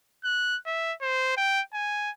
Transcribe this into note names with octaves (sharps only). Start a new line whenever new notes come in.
F#6
E5
C5
G5
G#5